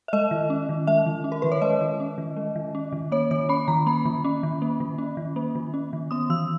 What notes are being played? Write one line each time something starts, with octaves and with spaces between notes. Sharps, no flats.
E5
G#3 D#5
D#3
C#4
D#3
G#3 E5
D#3
C#4
A#4
D#3 B4
C#5
G#3 D#5
D#3
C#4
D#3
G#3
D#3
C#4
D#3
A#3 C#5
D#3 C#5
C#4 B5
D#3 A#5
A#3 B5
D#3
C#4
D#3
A#3
D#3
C#4
D#3
A#3
D#3
C#4
D#3
B3 D#6
E3 E6